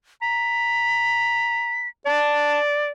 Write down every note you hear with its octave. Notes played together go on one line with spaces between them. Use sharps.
A#5 B6
D5 A5